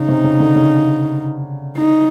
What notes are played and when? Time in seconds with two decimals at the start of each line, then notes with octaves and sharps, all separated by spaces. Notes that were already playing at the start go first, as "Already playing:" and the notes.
Already playing: C#3 D#4
0.09 C3
0.24 C#3
0.40 D3
0.56 C#3
1.78 D#4